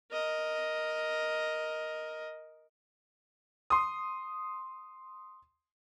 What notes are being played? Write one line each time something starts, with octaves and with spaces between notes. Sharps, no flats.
A#4 D#5
C6 D#6